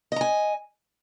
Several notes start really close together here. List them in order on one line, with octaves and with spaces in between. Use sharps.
D#5 A#5 G#5